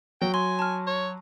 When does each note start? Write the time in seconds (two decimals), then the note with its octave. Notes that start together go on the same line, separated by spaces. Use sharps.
0.21 F#3 G5
0.34 G#5 C6
0.59 A5 F6
0.87 C#5